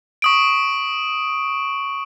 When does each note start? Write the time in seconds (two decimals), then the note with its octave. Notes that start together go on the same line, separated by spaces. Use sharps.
0.22 C#6 D#6 D7